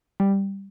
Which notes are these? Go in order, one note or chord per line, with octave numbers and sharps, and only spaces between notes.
G3